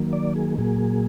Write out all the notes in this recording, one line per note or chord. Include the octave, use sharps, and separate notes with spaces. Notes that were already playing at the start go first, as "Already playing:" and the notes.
Already playing: D#3 F#3 A#3
D5
G#4
A#2 F#3 A#3 G#4